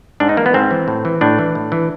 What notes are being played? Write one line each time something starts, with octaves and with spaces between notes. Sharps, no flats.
G#2 D4
D#4
E3 A#3
B3
G#2 C4
E3
A2
E3
A2 D4
E3
A2
E3